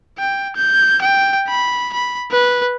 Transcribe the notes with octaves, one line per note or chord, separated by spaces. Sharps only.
G5
G6
G5
B5
B5
B4